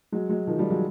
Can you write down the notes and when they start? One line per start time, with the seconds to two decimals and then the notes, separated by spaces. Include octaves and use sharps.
0.12 F#3 G#3
0.30 F#3 G#3
0.47 D#3 F3
0.59 F3 G3
0.70 F#3 G#3